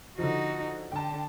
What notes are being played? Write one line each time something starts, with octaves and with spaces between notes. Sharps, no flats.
D3 F3 D#4 F#4
D3 G5 A5